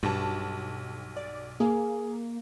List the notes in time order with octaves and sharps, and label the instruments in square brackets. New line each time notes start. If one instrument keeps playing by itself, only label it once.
[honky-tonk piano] B1 A5 [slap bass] G2
[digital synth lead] D5
[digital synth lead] A#3 [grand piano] G#4